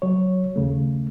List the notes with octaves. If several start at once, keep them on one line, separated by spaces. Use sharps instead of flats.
F#3 C#5
D#2 C#3 A3